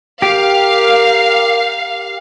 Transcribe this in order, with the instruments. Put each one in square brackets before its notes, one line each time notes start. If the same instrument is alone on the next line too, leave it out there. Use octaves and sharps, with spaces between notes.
[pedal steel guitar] G4 [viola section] A#4 [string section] F5